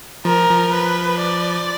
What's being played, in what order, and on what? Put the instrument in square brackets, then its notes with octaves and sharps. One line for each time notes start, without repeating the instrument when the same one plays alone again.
[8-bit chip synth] F3 [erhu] A#4
[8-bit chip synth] F3
[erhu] B4
D5